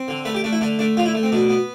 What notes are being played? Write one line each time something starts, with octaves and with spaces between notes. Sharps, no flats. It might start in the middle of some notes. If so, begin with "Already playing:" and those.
Already playing: C4
D3
A3 B4
G4
A3 D4
E4
D3 D4
A3 D4
D3 F4
E4
A3
C4
B2 D4
B3